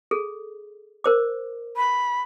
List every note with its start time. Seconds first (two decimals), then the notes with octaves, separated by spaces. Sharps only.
0.11 G#4 A4
1.04 A#4 C5 D6
1.77 B5